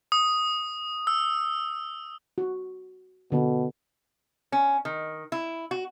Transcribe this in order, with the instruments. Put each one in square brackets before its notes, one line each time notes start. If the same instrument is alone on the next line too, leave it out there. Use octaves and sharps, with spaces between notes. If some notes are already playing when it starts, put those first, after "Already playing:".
[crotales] D#6
E6
[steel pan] F#4
[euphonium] B2 [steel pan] D3 B3
[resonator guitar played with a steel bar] C#4
D#3
E4
F#4